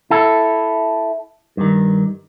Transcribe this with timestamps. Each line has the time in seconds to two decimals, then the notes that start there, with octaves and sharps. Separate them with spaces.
0.11 E4 A4
1.57 G2 D#3